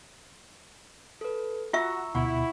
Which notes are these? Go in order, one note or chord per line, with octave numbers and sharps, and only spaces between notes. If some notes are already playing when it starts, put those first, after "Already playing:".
A4 B4
F4 F#4 E5 A#5 C#6 E6
D2 B2 E4 F#5 B5 C#6